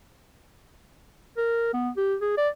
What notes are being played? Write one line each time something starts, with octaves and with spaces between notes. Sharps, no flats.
A#4
B3
G4
G#4
D5